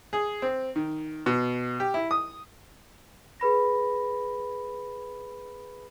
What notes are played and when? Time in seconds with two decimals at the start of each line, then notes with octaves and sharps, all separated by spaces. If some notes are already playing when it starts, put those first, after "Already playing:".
0.13 G#4
0.42 C4
0.76 D#3
1.26 B2
1.80 G4
1.94 E4
2.11 D#6
3.40 G#4 B4 B5 A#6